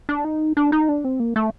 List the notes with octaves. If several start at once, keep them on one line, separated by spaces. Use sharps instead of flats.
D4
D#4
D4
D#4
D4
C4
A#3
A3